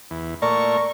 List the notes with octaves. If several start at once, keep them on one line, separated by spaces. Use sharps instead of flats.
E2
A#2 A3 A#4 D5 C#6